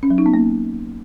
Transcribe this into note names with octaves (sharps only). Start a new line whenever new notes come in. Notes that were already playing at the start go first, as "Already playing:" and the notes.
C#4
F#3
D#4
B3
A#3